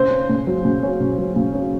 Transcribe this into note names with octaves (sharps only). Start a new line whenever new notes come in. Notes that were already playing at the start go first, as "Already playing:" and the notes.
Already playing: C#3 C5
C#4
C#3
F#3
C#3
C#4
C#3
F#3
C#3
C#4